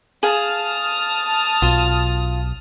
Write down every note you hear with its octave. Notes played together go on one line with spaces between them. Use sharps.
G#4 F5 A5 D#6 F6
B1 F4